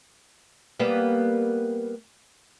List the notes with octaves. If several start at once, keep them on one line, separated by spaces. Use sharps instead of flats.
G3 A#3 B3